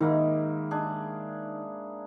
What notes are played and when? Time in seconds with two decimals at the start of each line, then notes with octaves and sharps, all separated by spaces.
0.01 G#2 D#3 A#3 E4
0.71 D4 G#4